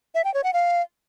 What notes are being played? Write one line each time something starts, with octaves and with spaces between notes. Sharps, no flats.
E5
G5
C#5
F#5
F5